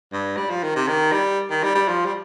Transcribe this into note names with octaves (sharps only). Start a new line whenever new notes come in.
G2
G3
F3
D#3
C3
D#3
G3
D#3
G3
G3
F3
G3